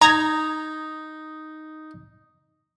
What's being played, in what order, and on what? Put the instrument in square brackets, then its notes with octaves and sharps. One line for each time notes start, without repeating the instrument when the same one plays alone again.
[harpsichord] D#4 [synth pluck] A#5 G#6